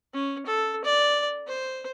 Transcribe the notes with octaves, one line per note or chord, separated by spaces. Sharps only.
C#4
A4
D5
C5